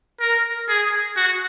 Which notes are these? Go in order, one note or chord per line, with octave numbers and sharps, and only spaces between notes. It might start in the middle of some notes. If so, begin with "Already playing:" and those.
A#4
G#4
F#4